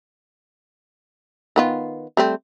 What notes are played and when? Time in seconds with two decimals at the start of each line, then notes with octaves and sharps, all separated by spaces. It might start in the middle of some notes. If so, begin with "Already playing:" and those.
1.56 D#3 B3 F4
2.17 G3 A3 C4